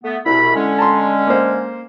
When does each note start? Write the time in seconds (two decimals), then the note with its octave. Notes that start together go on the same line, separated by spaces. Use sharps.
0.04 A3 B3
0.26 C2 B2 E4 B5
0.55 D3 G#3 C#4
0.78 A5 A#5 C6
1.27 A#3 C5